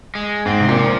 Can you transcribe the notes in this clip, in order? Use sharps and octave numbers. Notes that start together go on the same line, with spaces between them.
G#3
G#2 C4
C3
A#2
F3